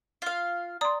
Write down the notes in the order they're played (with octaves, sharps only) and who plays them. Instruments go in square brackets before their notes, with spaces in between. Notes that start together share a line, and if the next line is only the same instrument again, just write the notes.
[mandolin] F4 F5
[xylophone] D5 D#6 [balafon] A#5 C6